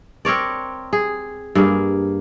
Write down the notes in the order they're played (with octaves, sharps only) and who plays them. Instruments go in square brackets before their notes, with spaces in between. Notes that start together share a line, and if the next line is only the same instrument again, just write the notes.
[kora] C4 A#4 C#5 D5
G#4
G2 A#3 G#4